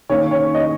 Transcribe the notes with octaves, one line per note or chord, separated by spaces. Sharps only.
D#3 A#3 C#4 C#5
C#5
D#5